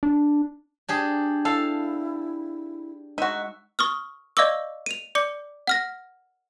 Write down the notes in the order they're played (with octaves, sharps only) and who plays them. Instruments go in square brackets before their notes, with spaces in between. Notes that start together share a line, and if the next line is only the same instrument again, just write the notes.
[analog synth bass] D4
[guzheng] D4 G4 G#4
[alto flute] E4 [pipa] A4 [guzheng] F5
[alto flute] G#3 [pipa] D#4 F#4 [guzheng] E5
[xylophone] C#6 D#6 F6
D5 D#5 F5 C#6 D6 E6
D#7 F7
D5 D6 C#7
F#5 F6 A#6